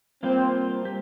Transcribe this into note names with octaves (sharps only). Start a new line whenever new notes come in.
G3 A#3 C4 F4 C5
G4